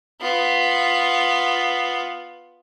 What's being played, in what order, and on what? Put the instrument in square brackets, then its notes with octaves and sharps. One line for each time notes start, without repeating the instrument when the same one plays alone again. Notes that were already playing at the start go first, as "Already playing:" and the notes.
[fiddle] B3 F4